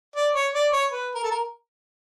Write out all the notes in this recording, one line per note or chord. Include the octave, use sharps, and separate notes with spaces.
D5
C#5
D5
C#5
B4
A#4
A4
A#4